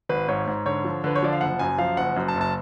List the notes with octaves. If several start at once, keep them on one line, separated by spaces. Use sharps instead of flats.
G#1 B4
G#2 C#5
G#2
D3 C#5
F3
D3 B4
C#5
F3 D5
F5
F#1 F#5
F#2 G#5
F3 F5
F#1 F#5
F#2
A5
F#1
A5